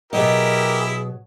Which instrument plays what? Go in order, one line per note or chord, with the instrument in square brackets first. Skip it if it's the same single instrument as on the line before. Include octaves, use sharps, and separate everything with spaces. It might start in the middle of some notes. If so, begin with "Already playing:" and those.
[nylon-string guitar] B2 F#3 D#5 [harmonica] E4 G4 [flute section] G#4 [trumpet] A#4